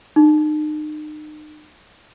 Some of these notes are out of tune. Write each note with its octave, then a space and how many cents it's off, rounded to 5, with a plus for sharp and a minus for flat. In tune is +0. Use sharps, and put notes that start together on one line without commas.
D#4 -35